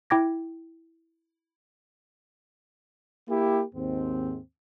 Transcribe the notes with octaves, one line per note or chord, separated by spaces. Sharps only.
E4 G5 D6 G#6 A#6
A#3 E4 G4
D#2 G#2 C4